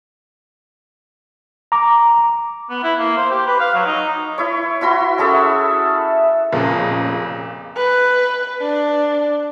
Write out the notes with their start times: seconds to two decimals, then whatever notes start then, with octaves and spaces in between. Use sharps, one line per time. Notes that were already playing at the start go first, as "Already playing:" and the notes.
1.72 A#5 D6
2.70 B3
2.84 E4
2.99 A#3
3.17 C5
3.31 G4
3.47 B4
3.60 F5
3.74 F#3
3.86 D#4
4.38 E4 C#5
4.81 E4 F#4 B5 C6
5.18 C#4 G#4 A4 E5
6.52 F1 A#2 C#3
7.76 B4
8.61 D4